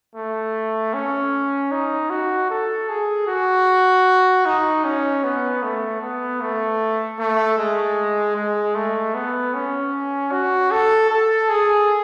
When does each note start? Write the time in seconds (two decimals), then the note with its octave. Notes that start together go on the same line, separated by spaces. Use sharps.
0.16 A3
0.94 C#4
1.72 D#4
2.10 F#4
2.51 A4
2.89 G#4
3.28 F#4
4.46 D#4
4.84 C#4
5.24 B3
5.63 A3
6.02 B3
6.41 A3
7.20 A3
7.58 G#3
8.36 G#3
8.75 A3
9.15 B3
9.54 C#4
10.32 F#4
10.71 A4
11.10 A4
11.49 G#4